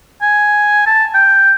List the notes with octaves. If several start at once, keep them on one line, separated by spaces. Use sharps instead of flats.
G#5
A5
G5